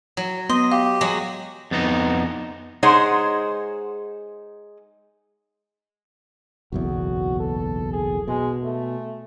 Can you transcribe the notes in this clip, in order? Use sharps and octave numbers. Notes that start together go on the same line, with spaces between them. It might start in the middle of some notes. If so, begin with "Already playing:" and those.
F#3
B3 D#5 C6
G4 F5
F#3 G#3 F#4
F2 B3 D#4
G#3 D#4 G#4 C5 C#5 F#5
F#1 B1 E2 F#4
A4
G#4
B2 G#3
A3